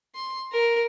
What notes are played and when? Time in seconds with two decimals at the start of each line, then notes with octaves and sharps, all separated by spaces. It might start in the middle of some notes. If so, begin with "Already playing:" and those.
0.15 C6
0.52 A#4